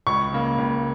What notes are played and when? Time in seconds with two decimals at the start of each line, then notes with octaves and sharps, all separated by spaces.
0.07 C#2 C#6
0.33 C#3 A#3
0.58 C#2